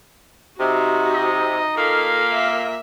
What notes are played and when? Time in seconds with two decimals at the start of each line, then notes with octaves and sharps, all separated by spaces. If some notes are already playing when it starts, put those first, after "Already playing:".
0.60 C3 D#4 F#4
1.14 D#5
1.77 A#2 A#3 A4 F5
2.32 E5